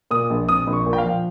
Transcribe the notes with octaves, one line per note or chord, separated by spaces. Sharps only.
A#2 D#6
A#1
C4 D#6
A#1
C#6
A#2
G5
F5
F3